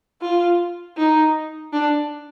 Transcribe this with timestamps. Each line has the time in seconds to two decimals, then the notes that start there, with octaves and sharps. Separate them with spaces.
0.22 F4
0.97 D#4
1.73 D4